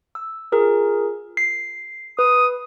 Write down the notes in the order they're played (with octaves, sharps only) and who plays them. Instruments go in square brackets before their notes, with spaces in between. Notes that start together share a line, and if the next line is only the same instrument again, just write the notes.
[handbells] E6
F4 G#4 A#4
C7
[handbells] B4 [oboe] D#6